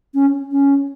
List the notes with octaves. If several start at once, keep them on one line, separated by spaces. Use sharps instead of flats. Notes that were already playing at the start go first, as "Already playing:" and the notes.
C#4
C#4